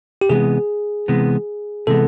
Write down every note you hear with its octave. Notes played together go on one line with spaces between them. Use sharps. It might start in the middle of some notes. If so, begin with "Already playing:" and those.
G4
C3 E3 G#3 B3 G#4
C3 E3 G#3 B3
C3 E3 G#3 B3 A4